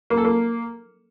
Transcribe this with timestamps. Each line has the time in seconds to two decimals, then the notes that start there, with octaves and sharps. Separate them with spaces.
0.10 A#3
0.18 A4
0.25 A#3